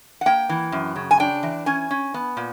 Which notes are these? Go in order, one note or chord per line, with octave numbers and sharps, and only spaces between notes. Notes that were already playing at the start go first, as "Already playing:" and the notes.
F#5
A#3 G5
E3
F#2
C#3
G#5
D4 G5
E3
C#4 G#5
C#4
B3
A#2